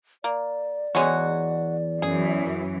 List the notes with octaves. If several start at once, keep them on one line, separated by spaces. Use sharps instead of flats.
A#3 D5
E2 G#3 F#4 C#5 G#5
F#2 E3 G#4